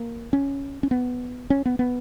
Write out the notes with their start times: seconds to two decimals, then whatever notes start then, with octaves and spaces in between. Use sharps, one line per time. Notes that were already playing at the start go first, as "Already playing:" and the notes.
Already playing: A#3
0.33 C#4
0.83 C#4
0.91 B3
1.50 C#4
1.66 B3
1.79 B3